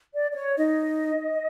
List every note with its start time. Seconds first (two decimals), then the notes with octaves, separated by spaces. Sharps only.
0.13 D5
0.31 D5
0.35 C#5
0.58 D#4 D#5